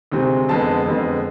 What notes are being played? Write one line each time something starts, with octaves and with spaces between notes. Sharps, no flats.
D2 C3 G#3 C4
F2 D3 G#3 B3 A5
F2 D3 G#3 B3